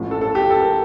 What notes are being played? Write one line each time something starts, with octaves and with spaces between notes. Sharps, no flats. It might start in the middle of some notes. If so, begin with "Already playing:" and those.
Already playing: A1 A2 F3
A4
A4
G4
A4
A#4